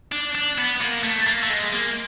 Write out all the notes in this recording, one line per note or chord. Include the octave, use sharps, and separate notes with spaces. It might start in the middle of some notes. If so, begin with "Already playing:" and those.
D4
D4
B3
A#3
A3
A#3
A3
G#3
A#3